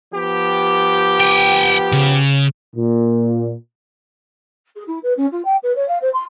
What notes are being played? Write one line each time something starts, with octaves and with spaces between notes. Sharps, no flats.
F3 B3 G4
F#5 G5
C#3
A#2
G#4
E4
B4
C#4
F4
G5
B4
C#5
F5
C5
C6